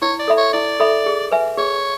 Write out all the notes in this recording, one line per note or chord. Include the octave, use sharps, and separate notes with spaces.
E4 C#5
D5
A4 E5 B5
C#5
E4 D5
A4 E5 B5
G#4
B4 E5 G#5
G#4 C#5